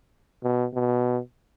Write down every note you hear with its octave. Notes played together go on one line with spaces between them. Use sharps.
B2
B2